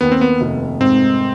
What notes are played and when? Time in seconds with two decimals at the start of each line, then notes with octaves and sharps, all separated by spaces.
0.01 D#2 B3
0.12 C4
0.21 B3
0.41 F1
0.81 G#2 C4